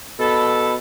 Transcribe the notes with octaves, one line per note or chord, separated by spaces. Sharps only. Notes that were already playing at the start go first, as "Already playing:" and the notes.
B2 A4 B5